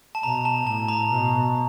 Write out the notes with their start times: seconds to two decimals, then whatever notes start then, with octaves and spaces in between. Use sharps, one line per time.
0.15 A5
0.23 B2 A#5
0.45 A5
0.67 A2 A5
0.88 A#5
1.10 B2